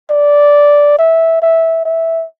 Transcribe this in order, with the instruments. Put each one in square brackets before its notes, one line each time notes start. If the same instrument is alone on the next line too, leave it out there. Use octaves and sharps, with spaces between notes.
[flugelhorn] D5
E5
E5
E5